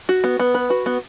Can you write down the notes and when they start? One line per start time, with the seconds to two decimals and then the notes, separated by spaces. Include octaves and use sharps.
0.09 F#4
0.24 B3
0.40 B3
0.55 B4
0.70 F#4
0.86 B3